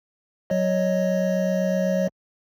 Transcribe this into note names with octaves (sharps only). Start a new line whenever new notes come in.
F#3 C#5 D#5